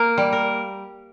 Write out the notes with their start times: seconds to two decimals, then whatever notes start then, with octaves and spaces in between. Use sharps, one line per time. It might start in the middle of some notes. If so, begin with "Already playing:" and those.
Already playing: A#3 A#4
0.18 G3
0.33 A#4